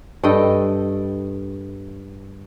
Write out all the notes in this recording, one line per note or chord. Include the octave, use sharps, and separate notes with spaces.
G2 A4 D#5 G5